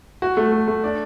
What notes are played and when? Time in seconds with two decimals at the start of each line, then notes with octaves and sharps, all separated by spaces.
0.22 F#4
0.37 A3
0.52 A3
0.68 A3
0.84 D4